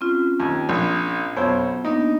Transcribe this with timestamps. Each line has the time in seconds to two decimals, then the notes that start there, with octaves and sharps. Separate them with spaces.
0.01 C4 C#4 F4
0.40 D#2
0.69 A#1
1.36 B1 F2 B3 C5 C#5 E6
1.85 A#3 B3 D4 D#4